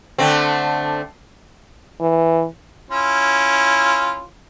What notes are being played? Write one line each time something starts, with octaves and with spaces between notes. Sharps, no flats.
D3 A3 C4
E3
C#4 E4 F4